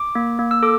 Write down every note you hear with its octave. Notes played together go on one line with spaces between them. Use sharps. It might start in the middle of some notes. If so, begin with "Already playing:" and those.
Already playing: D6
A#3
A#3
E6
A4 D6